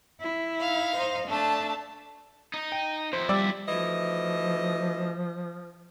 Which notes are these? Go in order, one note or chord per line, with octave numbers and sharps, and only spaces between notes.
E4
D#4 F5
C5 D#5
A3 D4 A5
D#4
G5
F2 E4 C5
G3 D5 E6
D2 E3 F3 D#5